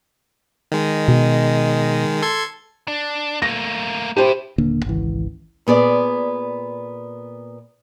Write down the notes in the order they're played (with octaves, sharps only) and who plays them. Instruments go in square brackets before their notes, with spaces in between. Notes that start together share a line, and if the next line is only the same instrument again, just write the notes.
[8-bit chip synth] D#3 G#3
[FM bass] B2
[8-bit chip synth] A4 C6 G#6
[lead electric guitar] D4
[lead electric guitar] A3 A#3 [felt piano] A#6
[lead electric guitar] A2 E4 [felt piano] G4 C5
[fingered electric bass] D#1 D3 A#3
G#1 C#2 E3
[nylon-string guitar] A#2 B3 G#4 D5